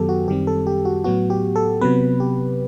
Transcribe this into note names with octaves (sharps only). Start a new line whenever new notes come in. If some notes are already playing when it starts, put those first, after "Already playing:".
Already playing: F#2 D#3 F#3 B3 G4 A4
F#4
F#2 D#3 G3 C4 G4
A4
G4
F#4
A2 F#3 B3 F#4
G4
A4
C3 F#3 B3 B4
G4